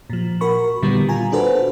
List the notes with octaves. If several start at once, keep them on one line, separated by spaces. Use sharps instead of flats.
A#2 F3
F#4 A#4 B5 C#6
A#2 D3 D#3 G3 A#3 B3
F4 G#5 A#5
D4 F#4 A4 B4 C5